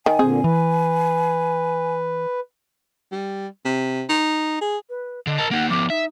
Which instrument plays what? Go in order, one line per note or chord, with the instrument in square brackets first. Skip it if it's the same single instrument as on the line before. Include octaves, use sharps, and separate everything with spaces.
[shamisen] D#3 [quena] G#5
[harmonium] A#2 D3 [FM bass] C4 [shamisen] G#4
[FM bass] E3 [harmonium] B4
[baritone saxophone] G3
C3
D#4
G#4
[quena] B4
[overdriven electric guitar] D3 [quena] D#5
[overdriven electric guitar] A#4 A5
[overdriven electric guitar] A#3 D#4 [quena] F#5
[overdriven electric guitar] F3 B3 [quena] D6
[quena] D#4 [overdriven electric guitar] E5